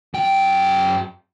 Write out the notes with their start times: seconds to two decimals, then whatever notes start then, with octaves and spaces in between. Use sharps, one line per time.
0.14 F#2 G5